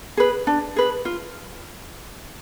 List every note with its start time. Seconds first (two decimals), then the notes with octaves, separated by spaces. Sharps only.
0.17 G#4 B4
0.47 D4
0.76 G#4 B4
1.05 F4